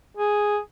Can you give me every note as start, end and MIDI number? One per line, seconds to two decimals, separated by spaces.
0.17 0.58 68